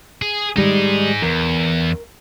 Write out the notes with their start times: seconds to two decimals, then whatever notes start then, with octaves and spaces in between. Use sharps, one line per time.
0.22 G#4
0.56 D#3 G3 G#3 D#4 G#4
1.22 E2 A#4